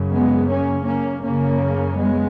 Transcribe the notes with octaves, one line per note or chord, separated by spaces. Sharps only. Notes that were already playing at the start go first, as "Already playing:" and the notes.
Already playing: F#2 C#3
G#3 B3
A#3 C#4
A#3 C#4
F#2 C#3 A#3 C#4
G#3 B3